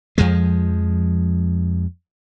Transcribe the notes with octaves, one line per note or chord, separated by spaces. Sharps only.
F2 F3 G#3